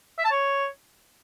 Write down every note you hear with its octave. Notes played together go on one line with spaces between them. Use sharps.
E5
A5
C#5